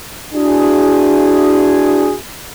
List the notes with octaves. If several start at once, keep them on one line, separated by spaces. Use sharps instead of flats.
D4 E4 F#4 G#4